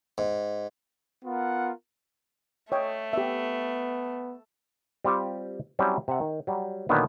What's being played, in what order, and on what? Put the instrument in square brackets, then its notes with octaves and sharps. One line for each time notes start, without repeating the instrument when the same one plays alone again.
[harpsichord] G#2
[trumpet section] B3 F4 A#4 F#5
[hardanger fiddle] A3 [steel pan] C#5 D#5 G5
[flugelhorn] B3 [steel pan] G4 E5
[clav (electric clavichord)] G3 C4 F4 G4
F#3 G3 C4 C#4 E4
C3 E5 F#5
D#3
F#3 G3
A#2 D3 D#3 F#3 A#3 B3